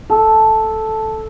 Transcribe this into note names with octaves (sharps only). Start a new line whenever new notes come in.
A4